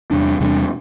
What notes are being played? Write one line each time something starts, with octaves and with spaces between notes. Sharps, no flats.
E2 C3 G3 D4
E2 C3 G3 D4